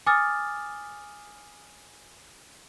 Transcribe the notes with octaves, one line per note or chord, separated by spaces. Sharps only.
G#5 D6 D#6 F6 A6